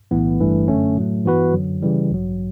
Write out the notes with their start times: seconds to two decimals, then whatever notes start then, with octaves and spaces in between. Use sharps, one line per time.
0.11 B1 A2 E3 B3
0.40 G1 G2 E3 A3
0.68 F#2 D3 A3 C#4
0.97 A2 F#3 A3
1.25 G2 E3 B3 F#4 B4
1.53 F#2 D3 F#3
1.82 C#3 E3 G3
2.11 A1 G2 F#3